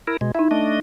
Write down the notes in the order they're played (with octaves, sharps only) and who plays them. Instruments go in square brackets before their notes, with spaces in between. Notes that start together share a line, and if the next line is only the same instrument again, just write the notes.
[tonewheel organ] E4 A#4
B2 G#3
[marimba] D#4 E5 [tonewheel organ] E4
[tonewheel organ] A3 D4 D#5